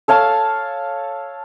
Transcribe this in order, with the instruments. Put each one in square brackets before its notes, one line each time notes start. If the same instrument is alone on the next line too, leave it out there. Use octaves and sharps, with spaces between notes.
[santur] A4 C#5 F5 A5